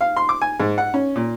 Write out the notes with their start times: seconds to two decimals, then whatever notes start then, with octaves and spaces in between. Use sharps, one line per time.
0.01 F5
0.16 C6
0.29 D6
0.42 G#5
0.60 G#2
0.78 F#5
0.94 C#4
1.16 A#2